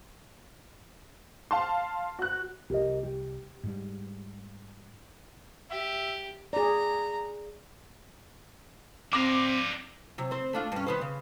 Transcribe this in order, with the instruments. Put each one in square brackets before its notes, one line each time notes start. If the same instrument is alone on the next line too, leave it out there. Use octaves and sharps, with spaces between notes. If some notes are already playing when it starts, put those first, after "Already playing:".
[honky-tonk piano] F5 A5 C6
F#4 F#6
[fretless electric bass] C2 [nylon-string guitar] G4 A#4 D#5
[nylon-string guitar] G4
[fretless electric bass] G#2 G3
[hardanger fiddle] G4 [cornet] E5
[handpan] G#4 D5 [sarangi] A#5
[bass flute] C4 [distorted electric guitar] D4 F5 [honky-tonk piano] D6 A#6
[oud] C3 F#3
C4 C5
A3 D4 F4
G2 C#4
D#3 B3 C5
C#3